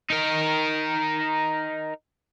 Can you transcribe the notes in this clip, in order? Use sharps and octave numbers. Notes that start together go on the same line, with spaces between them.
D#4 A#4